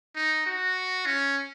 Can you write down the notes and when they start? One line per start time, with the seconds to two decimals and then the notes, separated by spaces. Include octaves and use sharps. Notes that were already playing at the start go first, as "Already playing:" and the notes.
0.15 D#4
0.46 F#4
1.06 C#4